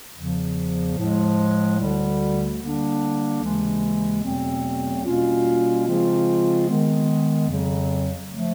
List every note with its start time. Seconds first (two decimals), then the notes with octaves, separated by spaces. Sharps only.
0.16 E2 C#3 F3
0.98 A2 F3 G#3
1.79 D2 D3 G3
2.60 D3 G3 A#3 D4
3.42 D#2 C#3 E3 G#3
4.23 E2 B2 F#3 A3 C4
5.05 B2 G3 A#3 C#4 F4
5.86 C#3 F3 G#3 C4 F4
6.67 D#3 G#3 B3
7.49 F2 C#3 F#3
8.31 F3 A3